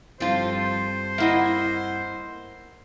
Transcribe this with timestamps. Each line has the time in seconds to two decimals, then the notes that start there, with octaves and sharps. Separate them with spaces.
0.20 G2 F3 C4 F4 A4 C5
1.18 A#3 E4 D#5 E5 F#5